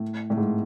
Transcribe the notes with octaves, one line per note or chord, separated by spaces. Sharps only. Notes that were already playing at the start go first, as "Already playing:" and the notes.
Already playing: A2
A2
G#2